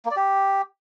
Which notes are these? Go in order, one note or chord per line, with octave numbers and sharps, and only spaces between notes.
A#3
D5
G4